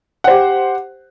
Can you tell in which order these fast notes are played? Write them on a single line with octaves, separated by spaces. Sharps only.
F#5 C5 G4